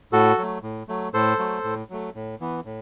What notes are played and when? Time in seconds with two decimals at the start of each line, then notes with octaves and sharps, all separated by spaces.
0.12 A2 F#4 A4
0.38 F#3 A3
0.63 A2
0.88 F#3 A3
1.14 A2 A4 C5
1.39 F#3 A3
1.64 A2
1.90 F#3 A3
2.15 A2
2.40 E3 B3
2.65 A2